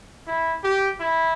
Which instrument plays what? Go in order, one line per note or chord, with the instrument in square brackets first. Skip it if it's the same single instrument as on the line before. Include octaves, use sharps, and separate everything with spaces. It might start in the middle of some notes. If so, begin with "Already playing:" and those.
[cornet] E4
G4
E4